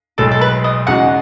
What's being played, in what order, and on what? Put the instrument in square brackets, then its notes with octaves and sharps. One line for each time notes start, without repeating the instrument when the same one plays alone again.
[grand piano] B1 A2 G#3 [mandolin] A4
[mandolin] A4
B4
D#5
[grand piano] E2 C#3 G#3 D#4 F#4 [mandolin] F#5